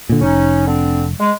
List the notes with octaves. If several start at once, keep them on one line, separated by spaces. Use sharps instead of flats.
A#2 D3
F1 C#4 D#4
D3 C4 D4
G#3